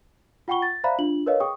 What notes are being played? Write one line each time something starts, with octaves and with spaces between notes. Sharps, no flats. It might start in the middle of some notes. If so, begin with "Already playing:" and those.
F4 F#5 G5 B5 C#6 G7
A6
C5 D5 E5 F5 A#5 B5
D4 F4 F#7
A#4 B4 C#5 D#5 F5
G#4 G5 C#6 D#6